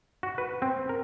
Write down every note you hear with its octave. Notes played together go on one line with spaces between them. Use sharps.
F#4
B4
C4
A#4